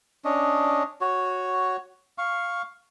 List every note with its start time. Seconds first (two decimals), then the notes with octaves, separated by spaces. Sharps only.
0.25 C#4 D4 D#5
1.01 F#4 C#5
2.18 F5 C#6